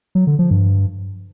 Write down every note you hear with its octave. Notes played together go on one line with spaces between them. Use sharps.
F#3
D3
F3
G2